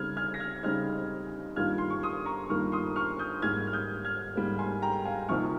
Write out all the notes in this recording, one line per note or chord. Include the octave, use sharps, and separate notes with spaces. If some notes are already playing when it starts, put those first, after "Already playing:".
Already playing: C#3 G3 C4 D#4 F6 G#6
F6 G#6
A#6
F6 G#6
C#3 G3 C4 D#4 F6 G#6
G2 D#3 G3 A#3 F4 F6 G#6
C6
C#6
C6 D#6
A#5 C#6
G2 D#3 G3 A#3 F4 C#6 F6
C6 D#6
C#6 F6
D#6 G6
G#2 G3 A#3 F6 G#6
F6
D#6 G6
F6 G#6
G#2 G3 A#3
G#5 C6
G5 A#5
F5 G#5
C2 C3 F3 A#3 D#4 C#6 F6